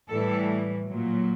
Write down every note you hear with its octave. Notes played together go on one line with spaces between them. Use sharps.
A2 E3 G3 A4
A#2 F#3